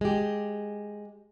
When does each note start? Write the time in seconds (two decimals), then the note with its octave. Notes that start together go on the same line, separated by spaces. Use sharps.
0.01 G#3 G4